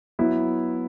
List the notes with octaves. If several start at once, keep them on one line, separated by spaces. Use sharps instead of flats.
F#3 B3 E4